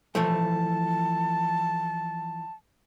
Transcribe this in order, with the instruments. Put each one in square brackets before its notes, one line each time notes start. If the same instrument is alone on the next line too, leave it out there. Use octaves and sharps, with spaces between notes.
[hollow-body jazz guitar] E3 F3 A3 [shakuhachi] A5